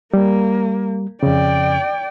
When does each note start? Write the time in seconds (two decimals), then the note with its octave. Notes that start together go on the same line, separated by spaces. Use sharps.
0.13 G3 A#3
1.23 F2 C#3 D5 G5